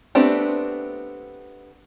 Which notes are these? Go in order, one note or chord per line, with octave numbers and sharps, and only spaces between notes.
A3 B3 C4 D4 G4